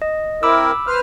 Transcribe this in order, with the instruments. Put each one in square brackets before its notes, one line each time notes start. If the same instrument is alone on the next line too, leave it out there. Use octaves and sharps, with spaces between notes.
[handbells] D#5
[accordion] C4 E4 A#4 [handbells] B5 D6 E6
[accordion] B4 C5 F6